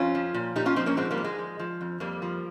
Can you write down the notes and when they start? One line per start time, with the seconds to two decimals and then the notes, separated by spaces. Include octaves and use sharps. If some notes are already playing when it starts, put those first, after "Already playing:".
Already playing: F2 C#4 F4
0.15 F3
0.34 A#2
0.56 A#2 D#4 G4
0.66 C#4 F4
0.76 F3 C4 D#4
0.86 A#3 C#4
0.97 G#2 G#3 C4
1.11 G3 A#3
1.17 G#2
1.24 G#3
1.38 F3
1.59 F3
1.81 F2
2.00 F2 G3 A#3
2.22 F3